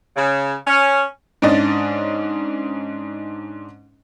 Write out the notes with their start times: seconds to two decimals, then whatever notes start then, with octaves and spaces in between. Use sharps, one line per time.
0.17 C#3
0.67 C#4
1.42 G#2 C#4 D4 D#5 A6